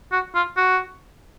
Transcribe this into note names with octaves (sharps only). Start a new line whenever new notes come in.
F#4
F4
F#4